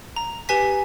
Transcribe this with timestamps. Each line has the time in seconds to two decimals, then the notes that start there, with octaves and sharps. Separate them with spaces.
0.16 A#5
0.49 G4 B4 G#5 B6